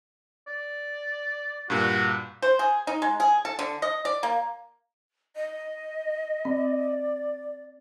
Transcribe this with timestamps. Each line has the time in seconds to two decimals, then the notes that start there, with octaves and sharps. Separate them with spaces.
0.47 D5
1.70 G2 A#2 F#4
2.42 C5
2.59 G#4
2.87 D#4
3.02 G#3
3.20 G#4
3.45 A4
3.59 D3
3.82 D#5
4.05 D5
4.23 A#3
5.36 D#5
6.45 C4 D5